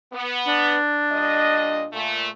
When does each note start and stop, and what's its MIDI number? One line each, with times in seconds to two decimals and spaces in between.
0.12 0.76 59
0.48 1.98 62
1.11 1.85 46
1.11 1.85 55
1.11 1.85 75
1.93 2.27 46
1.93 2.27 57